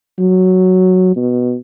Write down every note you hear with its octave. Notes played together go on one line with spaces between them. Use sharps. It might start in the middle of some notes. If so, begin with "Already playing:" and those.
F#3
B2